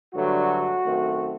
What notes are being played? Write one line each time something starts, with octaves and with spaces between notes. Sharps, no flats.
G2 D3 F#3 A3 F#4
F#2 D#3 A3 C4